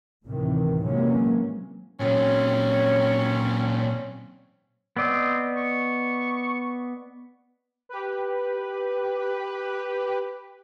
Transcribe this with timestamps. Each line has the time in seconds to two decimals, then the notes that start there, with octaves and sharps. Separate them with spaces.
0.25 D2 A2 C3 D#3 E3
0.83 C3 E3 F#3 G#3 A#3 C#4
2.00 A#2 F#3 C4 C#4
4.97 B3 C4 D5 D#5
5.56 C#6
7.89 G4 B4